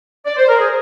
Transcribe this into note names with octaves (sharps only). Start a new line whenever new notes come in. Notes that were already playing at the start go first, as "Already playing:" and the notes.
D5
C5
A#4
G#4